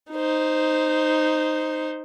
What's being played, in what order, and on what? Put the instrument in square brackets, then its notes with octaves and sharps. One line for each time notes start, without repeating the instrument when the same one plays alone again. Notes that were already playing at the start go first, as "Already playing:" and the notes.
[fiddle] D#4 C5